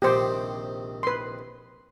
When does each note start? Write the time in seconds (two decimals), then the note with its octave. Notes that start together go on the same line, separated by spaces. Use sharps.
0.02 A#1 C3 D#3 G4 C5
1.03 B4 C6